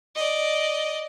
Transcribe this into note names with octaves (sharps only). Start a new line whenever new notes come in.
D5 D#5